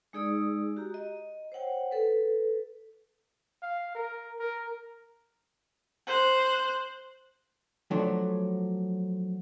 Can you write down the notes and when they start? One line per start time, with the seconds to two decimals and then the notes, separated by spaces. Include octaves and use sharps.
0.13 G#3 D#4 G#4 D5 D#6 E6
0.77 F#4 G4 A#5
0.94 D#5
1.52 C5 C#5 F#5 G5
1.91 A4 B4
3.62 F5
3.95 A#4
4.39 A#4
6.07 C5 F#6
7.91 F3 F#3 A3 D4 F#4